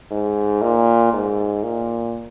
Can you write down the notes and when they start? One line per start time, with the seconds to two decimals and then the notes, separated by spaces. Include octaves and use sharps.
0.11 G#2
0.62 A#2
1.13 G#2
1.63 A#2